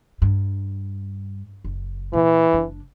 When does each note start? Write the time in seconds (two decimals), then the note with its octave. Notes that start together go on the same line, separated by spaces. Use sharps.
0.22 G2
1.65 F#1
2.13 A#2 E3
2.53 F#1 D4